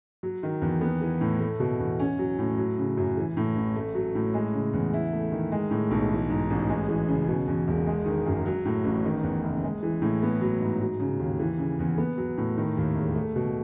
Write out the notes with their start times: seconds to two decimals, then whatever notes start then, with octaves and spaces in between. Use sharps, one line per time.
0.23 F#3
0.43 D#3
0.62 E2
0.81 B3
1.01 E3
1.21 A2
1.40 A3
1.60 B2
1.80 E2
1.99 C#4
2.19 F#3
2.39 A2
2.58 F#3
2.78 C#3
2.97 F#2
3.17 E3
3.37 A2
3.56 A1
3.76 A3
3.95 F#3
4.15 A2
4.34 G#3
4.54 C#3
4.73 E2
4.94 E4
5.13 A3
5.32 D#3
5.52 G#3
5.71 A2
5.91 B1
6.10 E3
6.29 G#2
6.50 A1
6.69 G#3
6.88 E3
7.08 C#3
7.28 B2
7.47 E2
7.68 E1
7.87 G#3
8.06 D#3
8.26 F#2
8.46 F#3
8.65 A2
8.85 A1
9.05 D#3
9.23 E2
9.43 F#1
9.64 G#3
9.83 E3
10.02 A2
10.22 B3
10.41 F#3
10.60 G#2
10.80 F#3
11.00 C#3
11.19 D#2
11.39 E3
11.58 C#3
11.79 E2
11.98 B3
12.18 F#3
12.38 A2
12.57 D#3
12.77 D#2
12.96 E1
13.15 A3
13.36 B2